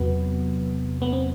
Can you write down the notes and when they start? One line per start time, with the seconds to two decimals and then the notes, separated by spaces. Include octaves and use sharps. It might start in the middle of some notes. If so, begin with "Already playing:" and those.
Already playing: E2 C3 F#3 B3
1.02 B3
1.13 C4